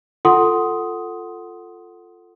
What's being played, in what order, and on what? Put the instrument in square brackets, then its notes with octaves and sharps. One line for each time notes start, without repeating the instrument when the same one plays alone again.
[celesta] F4 A4 F#5 C6 D#6